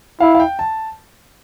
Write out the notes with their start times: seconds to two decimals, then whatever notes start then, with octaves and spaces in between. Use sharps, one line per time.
0.20 E4 F5
0.35 F5
0.40 G5
0.59 A5